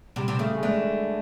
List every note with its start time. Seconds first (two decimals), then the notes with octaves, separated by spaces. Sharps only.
0.16 C3 G3
0.28 C3
0.39 C#3 A3
0.57 G#3
0.63 D3 A3